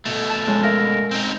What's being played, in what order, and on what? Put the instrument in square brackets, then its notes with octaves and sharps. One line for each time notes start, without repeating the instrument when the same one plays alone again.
[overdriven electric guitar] B2 A3
[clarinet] A5
[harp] F2 G#3 C#4
[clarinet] A#4 [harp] E5 F5 E6
[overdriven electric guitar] C4 D#4